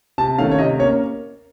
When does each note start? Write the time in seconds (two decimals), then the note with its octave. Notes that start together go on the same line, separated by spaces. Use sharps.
0.18 C3 A5
0.38 D#3 A3 C#4 F5
0.51 C#5
0.58 C3 D#5
0.79 A#3 C#4 C#5